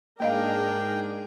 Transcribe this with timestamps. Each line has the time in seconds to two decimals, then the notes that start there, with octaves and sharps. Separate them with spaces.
0.20 G#2 A#3 D4 G#4 A#4 D#5 F5 G5